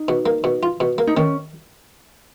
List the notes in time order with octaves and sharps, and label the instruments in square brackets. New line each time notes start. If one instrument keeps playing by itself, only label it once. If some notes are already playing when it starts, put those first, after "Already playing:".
Already playing: [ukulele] D#4
[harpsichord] B2
A#3
B2
F4
B2
A#3
[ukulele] D#4
[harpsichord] D#3 [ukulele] C#4